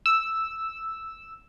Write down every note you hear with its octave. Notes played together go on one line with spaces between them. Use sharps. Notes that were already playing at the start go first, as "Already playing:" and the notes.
E6